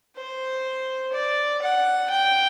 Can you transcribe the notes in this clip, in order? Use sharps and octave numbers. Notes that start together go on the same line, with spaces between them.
C5
D5
F#5
G5